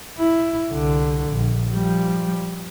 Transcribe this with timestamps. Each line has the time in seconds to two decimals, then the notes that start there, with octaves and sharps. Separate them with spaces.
0.19 E4
0.70 C2 D3
1.30 A#1
1.73 F3 G3